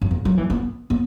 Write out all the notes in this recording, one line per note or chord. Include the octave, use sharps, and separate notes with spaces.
F#2
E2
F#3
E3
B3
B3